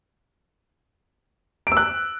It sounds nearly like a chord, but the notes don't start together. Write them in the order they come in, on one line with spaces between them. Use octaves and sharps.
D7 E6 F#6